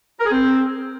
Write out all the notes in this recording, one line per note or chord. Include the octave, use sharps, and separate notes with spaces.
A#4
G#4
C4